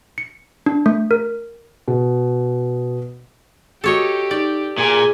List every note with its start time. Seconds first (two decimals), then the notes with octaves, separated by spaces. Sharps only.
0.18 C#7
0.66 D4
0.86 A3
1.11 A#4
1.88 B2
3.84 F#4 G4 A4 C#5 D#5 D6
4.31 D#4 D5
4.78 A#2 G#4 G#5